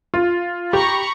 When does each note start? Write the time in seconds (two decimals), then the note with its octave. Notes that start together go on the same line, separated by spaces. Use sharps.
0.14 F4
0.73 G4 A#5 B5 C#6